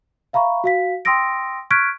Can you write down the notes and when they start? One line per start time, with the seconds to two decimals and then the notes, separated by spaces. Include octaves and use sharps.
0.33 E5 F5 A#5 B5 C#6
0.64 F#4 F5 B6
1.05 G5 C6 D#6 E6 A#6 D7
1.70 C#6 F6 F#6 G#6 B6 D7